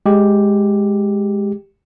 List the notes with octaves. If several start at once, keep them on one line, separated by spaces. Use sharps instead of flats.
G#3 G4